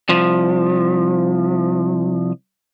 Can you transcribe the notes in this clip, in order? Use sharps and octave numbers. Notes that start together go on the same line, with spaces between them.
C2 F3